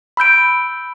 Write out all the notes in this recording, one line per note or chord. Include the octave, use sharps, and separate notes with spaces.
B5 E6 G6 D7